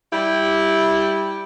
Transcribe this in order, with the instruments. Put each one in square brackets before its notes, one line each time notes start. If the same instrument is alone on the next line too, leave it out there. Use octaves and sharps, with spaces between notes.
[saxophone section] G3 E4 G4